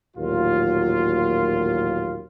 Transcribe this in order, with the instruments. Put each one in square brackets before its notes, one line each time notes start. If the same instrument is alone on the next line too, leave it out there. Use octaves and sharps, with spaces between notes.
[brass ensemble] A1 D#2 A#2 F#3 F4